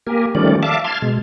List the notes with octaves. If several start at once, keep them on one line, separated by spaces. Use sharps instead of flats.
A#3 G4 A#4 G#5
D#3 F3 G3 A3 C#4 D5
E5 F5 A5 D6
A5 C6 F6 G#6
B2 G#3